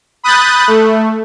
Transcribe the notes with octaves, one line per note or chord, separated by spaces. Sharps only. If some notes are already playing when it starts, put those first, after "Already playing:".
B5 D#6 F#6 G6 A6
A3